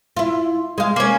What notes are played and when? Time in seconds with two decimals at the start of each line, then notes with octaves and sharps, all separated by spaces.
0.17 E4 F4
0.78 G#3 F5
0.96 A#3 C#4